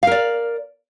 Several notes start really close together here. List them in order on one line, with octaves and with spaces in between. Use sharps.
F5 A#4 D5